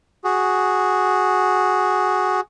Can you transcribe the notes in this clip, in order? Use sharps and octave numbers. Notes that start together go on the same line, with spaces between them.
F#4 G#4